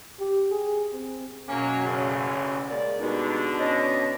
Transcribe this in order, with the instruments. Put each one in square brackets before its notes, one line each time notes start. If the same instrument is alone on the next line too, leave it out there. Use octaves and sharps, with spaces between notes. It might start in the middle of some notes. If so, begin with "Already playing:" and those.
[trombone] G4
G#4
C4
[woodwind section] F#2 B2 [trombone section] F#3 A#3 [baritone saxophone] C#4
[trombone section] A1 D2 [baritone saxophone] C#3
[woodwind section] G#3 A#3 D5
[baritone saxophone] B2 [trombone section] D3 D4 [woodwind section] G3 G#3 D#4
[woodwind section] C#4 D#5